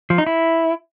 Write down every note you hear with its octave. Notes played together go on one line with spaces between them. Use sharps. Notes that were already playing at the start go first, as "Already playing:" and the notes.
F3
D#4
E4